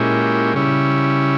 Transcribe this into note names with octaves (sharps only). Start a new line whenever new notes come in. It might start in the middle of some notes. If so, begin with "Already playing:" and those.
Already playing: A#2 G#3 C#4 E4 G4
C#3 G3 C#4 E4